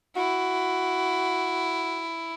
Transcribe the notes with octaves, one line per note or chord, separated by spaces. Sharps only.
E4 F#4